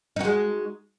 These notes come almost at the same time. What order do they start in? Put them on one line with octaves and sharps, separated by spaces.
D#4 F#4 G#3